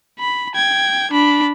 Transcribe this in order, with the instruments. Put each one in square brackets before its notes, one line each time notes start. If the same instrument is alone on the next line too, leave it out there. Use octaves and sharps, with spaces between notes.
[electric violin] B5
G5 G#6
D4 B5